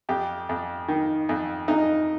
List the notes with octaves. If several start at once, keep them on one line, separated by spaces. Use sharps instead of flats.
F2 G4
F2
D#3
F2
F2 D#4